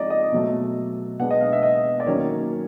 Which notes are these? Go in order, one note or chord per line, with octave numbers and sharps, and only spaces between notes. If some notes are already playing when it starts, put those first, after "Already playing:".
Already playing: F3 G#3 C4 D#4 D5 D#5
D#5
B2 F#3 A3
B2 G#3 B3 D4 F#5
D#5
F5
E5
D#5
D5
D#3 F#3 A#3 C#4 C#5